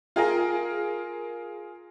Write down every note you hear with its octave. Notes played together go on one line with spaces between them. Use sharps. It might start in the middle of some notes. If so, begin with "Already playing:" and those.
F4 G#4 A#4